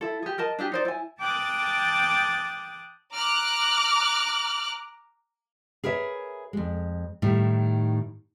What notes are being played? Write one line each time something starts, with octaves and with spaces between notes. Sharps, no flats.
E4 A4
G4 G#4
A#4 D#5 A5
D4 E4 G4 G#4
D#4 C5 D5
E4 G#5
G5 A5 D6 D#6 F#6 A6
A#5 D6 F6 F#6
G#4 A#4 B4 C#5 E5
F2 G#3
A2 D#3 G3